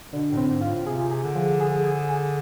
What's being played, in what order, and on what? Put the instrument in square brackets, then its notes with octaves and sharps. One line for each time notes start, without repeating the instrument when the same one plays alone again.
[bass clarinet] B2 [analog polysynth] D3
[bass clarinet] A2
[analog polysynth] C4
[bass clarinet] G#2
[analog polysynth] F4
[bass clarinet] A2
[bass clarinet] C3 [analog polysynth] G#4
[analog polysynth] G#4
[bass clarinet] D3
[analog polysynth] F3
G#4
G#4
G#4